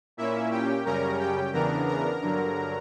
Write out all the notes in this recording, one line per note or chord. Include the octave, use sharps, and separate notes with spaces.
A#2 A#3 C#4 E4 E5
G4 G5
F#2 C#3 G3 C#4 A#4 A#5
G4 G5
E2 C#3 E3 B3 D4 A#4 A#5
A#4 A#5
G2 D3 F#3